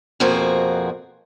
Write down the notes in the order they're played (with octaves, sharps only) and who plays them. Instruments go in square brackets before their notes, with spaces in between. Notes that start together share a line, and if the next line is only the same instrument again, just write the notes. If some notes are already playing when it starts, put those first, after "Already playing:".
[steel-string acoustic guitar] F2 B2 F3 A#3 F#4 G#4